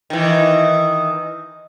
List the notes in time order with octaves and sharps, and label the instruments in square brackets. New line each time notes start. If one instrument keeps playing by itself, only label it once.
[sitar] D#3 E3